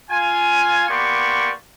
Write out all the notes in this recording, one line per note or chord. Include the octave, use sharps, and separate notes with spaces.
F4 G#5
A#3 B3 G4 D5 C6 C#6